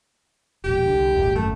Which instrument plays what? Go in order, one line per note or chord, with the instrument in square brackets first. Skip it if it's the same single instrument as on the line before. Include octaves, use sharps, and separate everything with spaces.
[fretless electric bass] E1 A#1 [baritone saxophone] G4
[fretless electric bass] C2 D3
D#1 G#1 D#2
[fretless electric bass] G#1 F#2 [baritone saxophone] A3